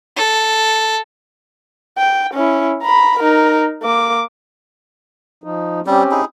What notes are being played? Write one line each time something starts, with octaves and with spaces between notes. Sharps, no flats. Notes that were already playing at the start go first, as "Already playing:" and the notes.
A4
G5
C#4 E4
A#5 B5
D#4 A#4
A#3 D6
F3 D#4
G3 C4 C#4 G4
D#4 E4 G#4